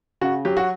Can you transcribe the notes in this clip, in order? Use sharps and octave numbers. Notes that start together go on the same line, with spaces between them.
C#3 F#4
F#3 G4
F#4